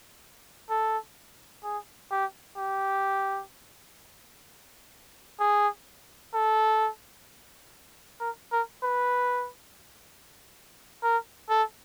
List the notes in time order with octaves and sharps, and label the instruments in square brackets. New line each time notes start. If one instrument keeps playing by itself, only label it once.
[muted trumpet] A4
G#4
G4
G4
G#4
A4
A#4
A#4
B4
A#4
A4